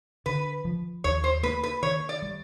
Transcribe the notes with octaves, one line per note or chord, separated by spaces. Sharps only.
D3 B4
F3
D#2 C#5
C5
A#3 B4
B4
D#3 C#5
D5
G3